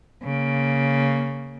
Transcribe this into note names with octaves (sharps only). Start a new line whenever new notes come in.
C#3 A#3